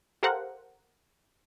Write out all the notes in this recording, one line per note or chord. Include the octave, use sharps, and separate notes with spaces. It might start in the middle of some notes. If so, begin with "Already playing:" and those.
G4 A4 A#4 C5 F5 F#5